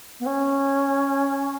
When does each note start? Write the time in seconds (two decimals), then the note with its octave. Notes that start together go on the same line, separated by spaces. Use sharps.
0.20 B3
0.26 C#4